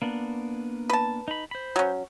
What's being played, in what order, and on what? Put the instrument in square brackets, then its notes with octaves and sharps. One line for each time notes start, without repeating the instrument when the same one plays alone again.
[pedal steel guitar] A#3 B3 D4
[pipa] B4 A5
[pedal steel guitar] D#4 B5
C5 B5
[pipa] F#3 C#4